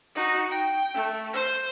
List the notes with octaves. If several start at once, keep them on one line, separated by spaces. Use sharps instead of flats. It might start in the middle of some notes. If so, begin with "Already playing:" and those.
D#4 F#4
G5
A3
C5